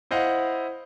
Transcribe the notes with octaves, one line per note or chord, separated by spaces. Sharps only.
E4 C5 D#5 F5 F#5